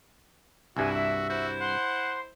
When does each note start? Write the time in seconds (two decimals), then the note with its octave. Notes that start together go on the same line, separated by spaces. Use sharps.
0.77 C2 G2 D4 E4 F#4 G#5
0.95 E5
1.29 E4 F#4 C5
1.60 F#5 C6